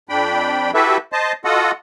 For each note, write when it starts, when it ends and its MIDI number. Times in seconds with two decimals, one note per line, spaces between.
0.09 0.71 41
0.09 0.71 62
0.09 0.71 79
0.09 0.71 83
0.74 0.97 64
0.74 0.97 66
0.74 0.97 67
0.74 0.97 69
0.74 0.97 71
0.74 0.97 76
1.12 1.32 72
1.12 1.32 75
1.12 1.32 81
1.45 1.71 65
1.45 1.71 66
1.45 1.71 69
1.45 1.71 75
1.45 1.71 78